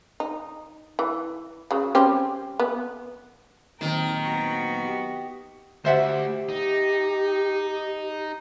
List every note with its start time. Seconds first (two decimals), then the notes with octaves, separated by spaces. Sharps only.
0.20 D#4
0.99 E3
1.71 C#3 F#3
1.95 G3 C4 C#4
2.59 B3
3.81 A#2 D#3 F#3 C4 G5 A#5
4.24 B3 F#4
4.85 G4
5.85 D2 G4 C5 E5 F#5
6.49 D#4